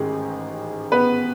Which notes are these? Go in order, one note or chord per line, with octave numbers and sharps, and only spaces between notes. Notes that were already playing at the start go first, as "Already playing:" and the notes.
Already playing: A1 G#2 D#3 G#4
B3 B4